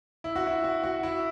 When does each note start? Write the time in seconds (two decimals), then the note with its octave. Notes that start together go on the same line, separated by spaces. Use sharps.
0.24 E4
0.36 F#4
0.47 E4
0.64 F#4
0.84 F#4
1.03 E4